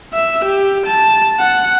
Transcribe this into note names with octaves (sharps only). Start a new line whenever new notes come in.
E5
G4
A5
F#5